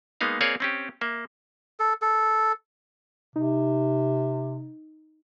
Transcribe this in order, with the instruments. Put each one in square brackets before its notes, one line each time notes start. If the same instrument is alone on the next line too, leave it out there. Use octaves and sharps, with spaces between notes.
[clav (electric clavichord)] G#3 A#3 B3 D#4 F5
A#3 C4 G#4 C#5 D5 F5
C4 C#4 G4
A#3 E5
[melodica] A4
A4
[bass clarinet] C3 [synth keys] D#4